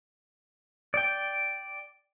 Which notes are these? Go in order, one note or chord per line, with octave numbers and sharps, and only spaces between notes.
D5 G5